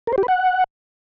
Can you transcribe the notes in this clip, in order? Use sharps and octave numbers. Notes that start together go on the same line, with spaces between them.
A#4
C5
G4
B4
F#5